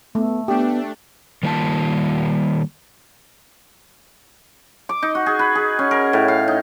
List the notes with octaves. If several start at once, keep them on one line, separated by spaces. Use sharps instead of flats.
A3 B3
A3 B3 D4 G4
D#3 G3 A#3 F4 F5 A5
D6
D#4
F#4
G#4
B4
G#4
C#4
A#4
A2
F5
D#4